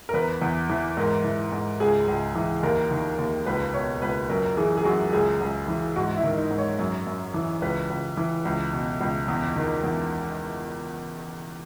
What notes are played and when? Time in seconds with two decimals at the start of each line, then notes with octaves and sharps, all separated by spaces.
0.09 A#4
0.14 E2 B4
0.42 E2
0.70 E3
0.97 G#2 A#4
1.24 E3
1.52 G#2
1.80 C#2 G#4
2.08 C#2
2.35 E3
2.63 D#2 A#4
2.91 D#3
3.18 D#2
3.46 C#2 B4
3.74 B2 C#5
4.02 C#2 B4
4.29 F#2 A#4
4.57 E3 G#4
4.77 G#4
4.85 F#2 F#4
5.13 C#2 G#4
5.40 C#2
5.68 E3
5.96 G#2 F#4
6.17 E4
6.23 D#3
6.37 D#4
6.51 G#2
6.58 C#5
6.79 F#2
7.07 F#2
7.34 E3
7.62 C#2 B4
7.90 C#2
8.17 E3
8.45 C#2
8.73 B2
9.01 C#2
9.28 E2
9.56 D#3
9.84 E2